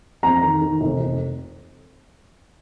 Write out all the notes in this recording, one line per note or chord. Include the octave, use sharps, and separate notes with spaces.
F2 A#5
D#3
D#3
F1
F1